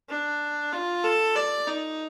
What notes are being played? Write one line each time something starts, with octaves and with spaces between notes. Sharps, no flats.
D4
F4
A4
D5
D#4